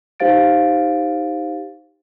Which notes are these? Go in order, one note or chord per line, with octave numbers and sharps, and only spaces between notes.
D#4 G4 C5 F5 A6 D7